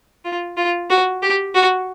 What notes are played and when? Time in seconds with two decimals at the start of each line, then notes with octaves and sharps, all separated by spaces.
0.25 F4
0.57 F4
0.90 F#4
1.22 G4
1.54 F#4